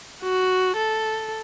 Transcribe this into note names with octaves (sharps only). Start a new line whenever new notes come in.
F#4
A4